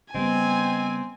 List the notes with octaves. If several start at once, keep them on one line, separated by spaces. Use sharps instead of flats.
C#3 G3 B3 C4 D#5 G#5